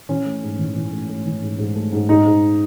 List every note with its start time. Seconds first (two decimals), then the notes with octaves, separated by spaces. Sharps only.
0.09 E3 C#4
0.25 A3
0.42 G#2
0.59 E3
0.75 E3
0.92 A3
1.09 A3
1.25 E3
1.42 G#2
1.58 G#2
1.75 A3
1.92 G#2
2.08 G#2 D#4
2.26 G#2